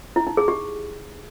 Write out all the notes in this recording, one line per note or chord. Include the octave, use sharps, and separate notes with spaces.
E4
D#4
G#4
G4